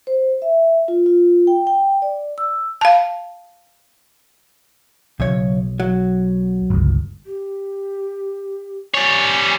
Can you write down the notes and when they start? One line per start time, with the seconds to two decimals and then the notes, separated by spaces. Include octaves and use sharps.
0.07 C5
0.42 E5
0.88 F4
1.06 F4
1.47 G5
1.67 G5
2.02 D5
2.38 E6
2.81 F5 A5
5.20 B1 F#2 C#3 C#5
5.80 F#3 F#4
6.70 G1 C#2
7.26 G4
8.95 G3 C#5 G#5